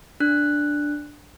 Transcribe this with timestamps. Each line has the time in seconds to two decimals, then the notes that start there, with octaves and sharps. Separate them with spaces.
0.20 D4 F#6